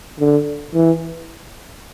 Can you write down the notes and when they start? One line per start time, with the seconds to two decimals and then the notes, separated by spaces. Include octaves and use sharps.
0.20 D3
0.75 E3